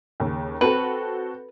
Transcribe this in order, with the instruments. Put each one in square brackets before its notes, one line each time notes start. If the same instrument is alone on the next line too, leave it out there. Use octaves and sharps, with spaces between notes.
[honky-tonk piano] D#2 C#3
[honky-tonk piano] C4 F#4 A4 [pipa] B4